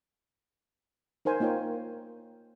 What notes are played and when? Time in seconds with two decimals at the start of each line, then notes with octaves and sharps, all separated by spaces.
1.25 D#4 A#4 C5 G#5
1.40 A#3 D#4 F4 C#5 G5